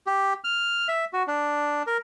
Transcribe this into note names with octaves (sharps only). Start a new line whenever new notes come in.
G4
F6
E5
F#4
D4
A#4